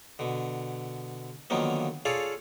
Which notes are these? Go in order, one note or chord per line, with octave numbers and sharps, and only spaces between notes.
B2 D3
D3 D#3 F3 F#3 A#3 B3
F4 G#4 A4 C#5 D5 F5